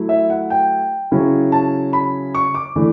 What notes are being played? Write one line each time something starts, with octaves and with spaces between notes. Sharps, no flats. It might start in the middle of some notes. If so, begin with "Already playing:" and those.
Already playing: F#3 A3 E4
E5
F#5
G5
C#3 F#3 C#4 E4
A5
B5
C#6
D6
E3 A3 D4